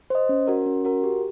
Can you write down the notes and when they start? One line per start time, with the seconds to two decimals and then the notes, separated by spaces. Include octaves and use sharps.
0.10 C5 D#5
0.29 C#4
0.47 F#4 A#4
0.66 C#4
0.85 F#4 A#4
1.03 G4